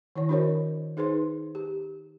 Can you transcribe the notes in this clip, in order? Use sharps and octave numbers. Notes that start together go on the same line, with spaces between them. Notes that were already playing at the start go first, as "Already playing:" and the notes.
D#3 E4 C#5
D4 F#4 A#4 C5 C#5 D#5
D#4 G#4 B4 C5 C6
G4